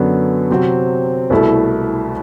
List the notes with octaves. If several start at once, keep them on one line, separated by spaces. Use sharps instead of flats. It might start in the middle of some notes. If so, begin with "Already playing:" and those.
Already playing: F#2 D3 F#3 B3
C3 F#3 C4 F#4
C2 B2 A3 E4 A4